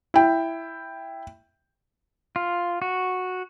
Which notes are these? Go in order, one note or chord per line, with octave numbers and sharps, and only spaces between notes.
E4 G5
F4
F#4